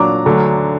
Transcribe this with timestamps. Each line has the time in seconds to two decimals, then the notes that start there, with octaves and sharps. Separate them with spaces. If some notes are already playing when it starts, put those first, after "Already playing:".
Already playing: A#2 F#3 D4 A#5 D6
0.26 D2 D3 F#3 D4